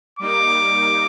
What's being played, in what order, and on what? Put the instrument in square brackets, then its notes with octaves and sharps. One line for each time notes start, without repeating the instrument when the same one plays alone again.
[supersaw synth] G3 A#3 D#4 [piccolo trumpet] D6